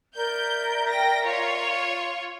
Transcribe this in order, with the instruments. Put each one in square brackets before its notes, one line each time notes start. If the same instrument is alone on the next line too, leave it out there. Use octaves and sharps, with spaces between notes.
[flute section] A#4 D5 E5 [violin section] G6
[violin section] G5 A#6
F4 C#5